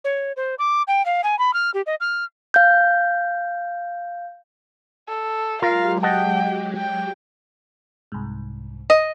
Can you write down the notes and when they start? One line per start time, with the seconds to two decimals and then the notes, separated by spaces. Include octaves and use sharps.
0.04 C#5
0.37 C5
0.59 D6
0.87 G5
1.06 F5
1.24 G#5
1.39 B5
1.54 F6
1.74 G4
1.86 D#5
2.00 F6
2.54 F5 G6
5.08 A4
5.62 F#3 G#3 F4 G4 A#4 F5
6.03 D#5 F#5 G5 A5
6.77 G5
8.12 C2 G#2
8.90 D#5